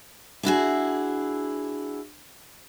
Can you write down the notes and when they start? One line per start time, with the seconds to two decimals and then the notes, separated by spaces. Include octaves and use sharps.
0.43 D4 E4 F#4 G#4